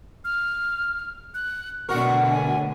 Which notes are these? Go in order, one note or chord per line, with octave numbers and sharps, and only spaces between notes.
F6
F#6
F#2 B2 D3 A3 F#4 A#4 C#6
G#5